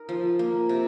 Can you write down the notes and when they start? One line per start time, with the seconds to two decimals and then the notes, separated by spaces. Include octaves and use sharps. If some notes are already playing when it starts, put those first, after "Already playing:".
Already playing: D#4 A#4
0.09 F3
0.39 A#3
0.69 C3